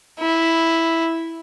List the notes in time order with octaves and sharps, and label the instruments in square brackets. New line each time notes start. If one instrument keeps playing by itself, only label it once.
[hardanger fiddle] E4